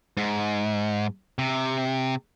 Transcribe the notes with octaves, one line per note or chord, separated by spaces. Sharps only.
G#2
C3